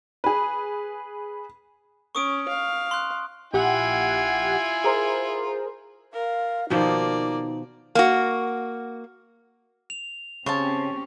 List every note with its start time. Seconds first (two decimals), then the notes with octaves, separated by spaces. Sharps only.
0.24 G#4 B4
2.15 C#4 C#6 D#6 D7
2.48 F5
2.91 C6 F#6
3.53 A#1 E4 F4 G4 F#5 G#5
4.84 G#4 A#4 C5
6.13 A#4 F5
6.70 B2 D#3 F3 A#3 D#4 D5
7.95 A#3 F#4
9.90 F7
10.46 C#3 C4 C#4 G4 C5 C#5 A5 C#6